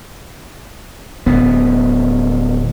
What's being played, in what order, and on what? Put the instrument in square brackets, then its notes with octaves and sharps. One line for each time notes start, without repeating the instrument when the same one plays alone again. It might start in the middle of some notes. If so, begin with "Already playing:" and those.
[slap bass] D1 B3